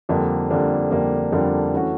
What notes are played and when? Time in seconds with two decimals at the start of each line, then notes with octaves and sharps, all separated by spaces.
0.09 F2 D3 G3 A#3 D4
0.51 F2 D3 G3 A#3 D4
0.91 F2 D3 G3 A#3 D4
1.32 F2 D3 G3 A#3 D4
1.73 E3 A3 C#4 F#4